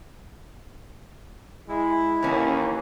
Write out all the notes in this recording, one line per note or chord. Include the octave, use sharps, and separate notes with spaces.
G#3 E4
D#2 E3 C#4